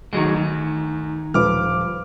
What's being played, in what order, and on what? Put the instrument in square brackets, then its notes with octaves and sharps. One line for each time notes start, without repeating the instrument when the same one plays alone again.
[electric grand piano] D2 [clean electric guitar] D#3 F#3 G#3
[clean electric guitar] D#3
[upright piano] D#1 F3 B4 [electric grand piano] D6 F6